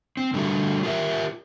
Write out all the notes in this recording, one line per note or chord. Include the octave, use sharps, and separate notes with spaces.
C4
D3 G3 A3 F#4
F4 G4 A#4 E5